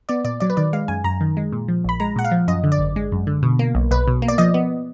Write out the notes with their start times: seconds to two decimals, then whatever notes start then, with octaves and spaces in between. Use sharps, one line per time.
0.09 B3 D5
0.25 A#2 D5
0.40 F#3 D5
0.50 B4
0.57 D#3 D5
0.73 G#3 F5
0.88 F#2 G#5
1.04 F#2 A#5
1.21 D#3
1.37 G#3
1.52 A#2
1.68 F3
1.84 A#1 B5
2.00 G#3 A#5
2.16 A#2 F#5
2.24 F5
2.31 F3
2.48 F#2 D#5
2.64 D3
2.72 D5
2.79 G#1
2.96 G#3
3.12 F#2
3.27 D3
3.43 B2
3.59 A#3
3.75 B1
3.91 B1 B4
4.07 B2
4.22 A#3
4.28 D5
4.38 F3 D#5
4.54 B3